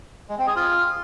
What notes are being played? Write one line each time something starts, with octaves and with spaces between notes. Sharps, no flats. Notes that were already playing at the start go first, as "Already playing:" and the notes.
G#3
C4
G#4
F4